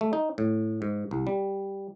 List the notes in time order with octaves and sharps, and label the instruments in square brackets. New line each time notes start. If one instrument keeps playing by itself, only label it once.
[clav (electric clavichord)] A3
D#4
A2
G#2
C2
G3